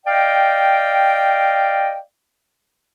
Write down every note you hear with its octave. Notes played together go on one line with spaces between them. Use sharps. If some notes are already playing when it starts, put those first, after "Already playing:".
D5 D#5 F5 G5